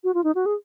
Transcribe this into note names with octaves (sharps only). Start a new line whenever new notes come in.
F#4
F4
D#4
F#4
G#4